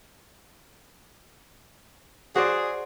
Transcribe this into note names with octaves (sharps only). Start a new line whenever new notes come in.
F#4 G#4 C5 D5